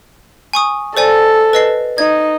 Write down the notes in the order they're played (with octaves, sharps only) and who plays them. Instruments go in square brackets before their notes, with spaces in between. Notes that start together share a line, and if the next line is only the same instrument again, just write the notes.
[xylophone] G#5 C#6 D#6
[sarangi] A4 [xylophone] C5 D5 G#5
[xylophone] B4 D#5 C7
[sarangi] D#4 [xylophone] G#6